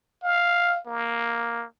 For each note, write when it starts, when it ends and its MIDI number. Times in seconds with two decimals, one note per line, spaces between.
0.23 0.80 77
0.86 1.65 58